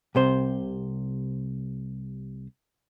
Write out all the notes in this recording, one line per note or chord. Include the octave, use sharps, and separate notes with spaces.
C2 C3 C5